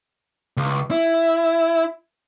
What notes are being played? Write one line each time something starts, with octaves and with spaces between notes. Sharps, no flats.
C#2
E4